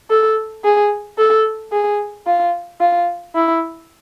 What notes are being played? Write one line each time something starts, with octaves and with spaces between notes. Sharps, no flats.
A4
G#4
A4
G#4
F4
F4
E4